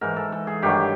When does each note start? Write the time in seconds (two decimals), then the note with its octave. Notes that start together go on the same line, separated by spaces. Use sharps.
0.01 G#2 E3 A#4
0.16 A4
0.32 A4
0.47 G#4
0.62 G2 D#3 F#3 G4